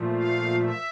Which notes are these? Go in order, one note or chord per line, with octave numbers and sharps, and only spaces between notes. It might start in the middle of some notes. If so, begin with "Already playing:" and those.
Already playing: A#2 F3 A3
F5
E5